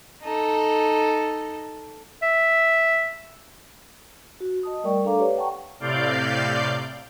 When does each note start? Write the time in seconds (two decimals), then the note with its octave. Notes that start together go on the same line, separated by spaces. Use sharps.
0.23 D#4 A4
2.23 E5
4.40 F#4
4.63 D#5 A5 D#6
4.83 G3 A3 A#4 D5 G5 C#6
5.04 A3 D4 A4 F5 A#5 D6
5.19 G4 B4 C#5 D5 F5
5.37 F#5 G5 A5 A#5 C#6
5.80 A2 C3 D5 F5 G6